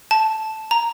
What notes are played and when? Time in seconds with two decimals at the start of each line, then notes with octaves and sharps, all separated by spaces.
0.11 A5
0.71 A#5